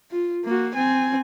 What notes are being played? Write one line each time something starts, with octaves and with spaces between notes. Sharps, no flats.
F4
A#3 F#4
C4 G#5